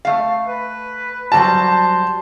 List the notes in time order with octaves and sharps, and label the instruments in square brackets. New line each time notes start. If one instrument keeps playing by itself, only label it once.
[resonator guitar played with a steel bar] A3 F5
[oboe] B4
[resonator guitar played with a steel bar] F#3 G3 F#4 [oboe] C5 [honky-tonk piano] A5